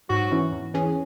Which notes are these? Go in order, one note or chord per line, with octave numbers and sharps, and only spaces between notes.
G#2 F#3 F#4
E3 C#4 E4
E2
E3 C#4 G#4